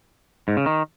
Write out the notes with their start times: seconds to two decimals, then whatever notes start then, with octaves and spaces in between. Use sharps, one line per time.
0.48 G#2
0.57 C#3
0.66 D#3